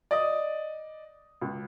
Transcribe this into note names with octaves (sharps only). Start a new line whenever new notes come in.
D5 D#5 D#6
C#2